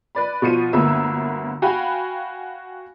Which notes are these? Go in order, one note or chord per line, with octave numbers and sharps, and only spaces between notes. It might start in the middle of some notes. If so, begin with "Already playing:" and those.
B4 D5 B5
B2 F3 F4 C#7 D#7
G1 D2 A#3 B3 E5 E6
F#4 F5 G5 G#5 B5